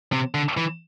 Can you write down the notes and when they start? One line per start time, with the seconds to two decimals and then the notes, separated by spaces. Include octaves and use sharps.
0.12 C3
0.34 D3
0.57 E3